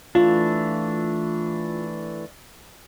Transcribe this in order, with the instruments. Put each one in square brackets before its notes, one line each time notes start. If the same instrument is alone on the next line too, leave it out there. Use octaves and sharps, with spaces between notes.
[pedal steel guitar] E3 A3 D4 [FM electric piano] F4